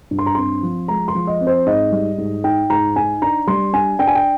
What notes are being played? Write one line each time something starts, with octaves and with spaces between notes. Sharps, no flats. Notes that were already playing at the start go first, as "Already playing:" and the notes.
G2
C6
A#5
C4 C6
F3
G#3 A#5
C6
F3
D#5
C4
C5
G#2 D#5
G3
G#2
D#4 G5
G#2 A#5
D#4 G#5
D4 A#5
G3 C6
D4 G#5
D4 G5
G#5
G5